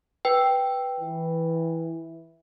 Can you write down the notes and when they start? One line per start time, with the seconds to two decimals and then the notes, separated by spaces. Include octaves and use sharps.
0.25 B4 G5
1.01 E3